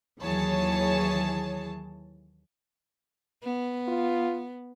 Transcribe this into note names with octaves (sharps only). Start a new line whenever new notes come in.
D#2 E3 F#3 G#4 C#5 A5
B3
F4